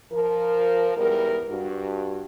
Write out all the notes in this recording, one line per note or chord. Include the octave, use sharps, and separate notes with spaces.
F3 A#4
E2 G#2 G3 B3 A#4
G2 F#4